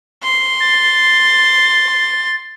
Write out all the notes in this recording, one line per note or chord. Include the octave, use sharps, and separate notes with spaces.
C6
A6